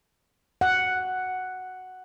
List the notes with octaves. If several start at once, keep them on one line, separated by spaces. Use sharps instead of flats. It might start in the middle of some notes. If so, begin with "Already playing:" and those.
F#5